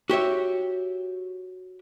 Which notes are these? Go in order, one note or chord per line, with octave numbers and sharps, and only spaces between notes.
F#4 G4 C#5 E5